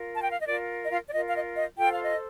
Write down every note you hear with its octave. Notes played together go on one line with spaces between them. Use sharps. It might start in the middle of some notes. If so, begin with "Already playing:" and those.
Already playing: F4 A#4
A5
G5
F5
D#5
F4 A#4 D5
D#5
F4 F5
D5
F4 A#4 D#5
F5
D#5
D#5
F4 A4 C5 G5
F5
D#5